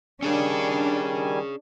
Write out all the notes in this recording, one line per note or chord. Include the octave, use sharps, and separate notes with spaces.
D#3 G3 C#4 D4 G#4 C#5 G#5